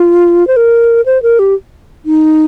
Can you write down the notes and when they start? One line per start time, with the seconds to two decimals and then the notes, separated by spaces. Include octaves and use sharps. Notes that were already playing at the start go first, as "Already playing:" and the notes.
Already playing: F4
0.47 C5
0.56 A#4
1.06 C5
1.23 A#4
1.39 G4
2.05 D#4